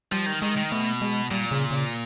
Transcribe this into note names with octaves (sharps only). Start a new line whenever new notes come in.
F3 G3
D#3
D#3 G#3
D#3
B2 A3
G#3
A#2 G3
C#3
C#3